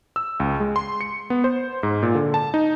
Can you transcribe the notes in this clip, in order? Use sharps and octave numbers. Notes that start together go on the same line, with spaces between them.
E6
C#2
G#3
C6
C#7
B3
C5
G#2
A#2
D3
A5
D#4